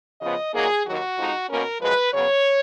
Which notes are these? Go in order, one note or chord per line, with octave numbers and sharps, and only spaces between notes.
C#3 F3 B3 D#5
A#2 F#3 A#3 D#4 G#4
D#2 D#3 F#3 F#4
F2 F3 G#3 D#4
B2 A#3 C#4 A#4
F#2 F3 G#3 B4
C#3 F#3 B3 C#5